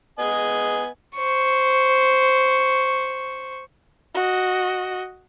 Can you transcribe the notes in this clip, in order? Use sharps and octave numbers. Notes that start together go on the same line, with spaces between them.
B3 D#5 G#5
C5 C#6
F#4 D#5